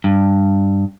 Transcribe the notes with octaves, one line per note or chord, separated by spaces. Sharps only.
G2